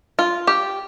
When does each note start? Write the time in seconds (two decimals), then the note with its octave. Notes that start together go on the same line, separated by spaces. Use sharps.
0.19 F4
0.47 G4